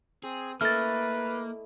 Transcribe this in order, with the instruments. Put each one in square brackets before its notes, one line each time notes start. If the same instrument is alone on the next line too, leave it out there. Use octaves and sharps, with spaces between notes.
[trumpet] C4 [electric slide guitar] G#4
[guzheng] A3 E4 D#5 [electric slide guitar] A#3 [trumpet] B4 [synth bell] F6 A6